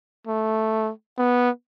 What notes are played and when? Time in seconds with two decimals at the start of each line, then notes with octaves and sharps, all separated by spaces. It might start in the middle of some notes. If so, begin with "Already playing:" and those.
0.27 A3
1.18 B3